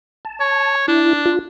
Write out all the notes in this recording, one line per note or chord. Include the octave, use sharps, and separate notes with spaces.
A5
C#5
D4 E4
F4